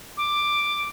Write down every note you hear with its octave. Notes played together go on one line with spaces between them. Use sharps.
D6